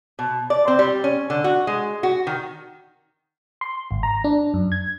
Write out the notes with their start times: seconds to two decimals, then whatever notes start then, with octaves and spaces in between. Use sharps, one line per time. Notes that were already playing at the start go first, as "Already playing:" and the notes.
0.19 B2
0.50 D5
0.68 C4
0.79 G3
1.04 C#4
1.30 D3
1.44 F#4
1.67 G#3
2.03 F#4
2.27 D#3
3.61 C6
3.91 G#1
4.03 A#5
4.24 D4
4.54 F#2
4.72 G#6